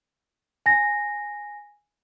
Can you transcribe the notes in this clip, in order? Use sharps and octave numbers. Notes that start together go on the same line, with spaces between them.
G#5 A#6